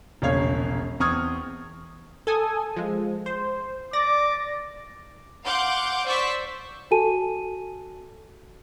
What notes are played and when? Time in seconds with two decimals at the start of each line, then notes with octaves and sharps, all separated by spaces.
0.22 E1 A#1 C#3 C#5 F5 G#6
1.00 E2 C4 C#6 D#6 F6 G#6
2.27 A4 G#5 D#6
2.76 F3 G#3
3.26 C5
3.93 D5 D6 A6 A#6
5.45 F5 F#5 C6 D6 G6
6.06 C5 D5 C#6 E6 B6
6.91 F#4 A4 G#5 A5 D#7